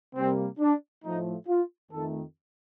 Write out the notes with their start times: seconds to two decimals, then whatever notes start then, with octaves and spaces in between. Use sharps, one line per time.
0.15 C3 G3 A#3 C4
0.60 D4
1.04 A2 F3 A3 D#4
1.48 F4
1.92 F2 D#3 A3 A4